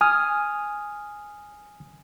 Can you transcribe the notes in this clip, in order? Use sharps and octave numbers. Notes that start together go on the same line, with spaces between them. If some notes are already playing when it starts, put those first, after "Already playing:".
G#5 D#6 F6